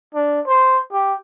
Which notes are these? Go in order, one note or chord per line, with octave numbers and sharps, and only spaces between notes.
D4
C5
G4